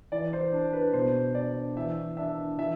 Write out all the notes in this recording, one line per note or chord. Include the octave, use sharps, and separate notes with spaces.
E3 D5
C5
D4
B4
B2 C5
D4 D5
E3 E5
D4 E5
E3 E5